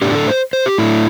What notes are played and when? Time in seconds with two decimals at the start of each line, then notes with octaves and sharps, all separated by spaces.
0.02 A2 A3 D4 G4
0.15 A4
0.27 C5
0.53 C5
0.66 G4
0.78 A2 A3 D4 E4